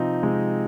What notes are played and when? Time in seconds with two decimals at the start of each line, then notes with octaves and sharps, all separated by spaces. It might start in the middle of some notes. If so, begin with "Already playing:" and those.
Already playing: C3 F3 C4 D#4
0.23 C3 G#3